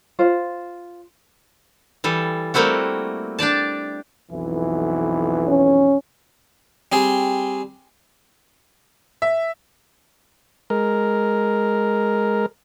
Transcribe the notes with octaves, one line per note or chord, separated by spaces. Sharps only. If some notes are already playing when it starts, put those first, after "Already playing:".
F4 C5
E3 G3 A4
G3 A3 A#3 C4 E4 F#4
D4 G4 D5 A5
B1 F2 E3
C#4
G3 C4 G#4
E5
G#3 A#4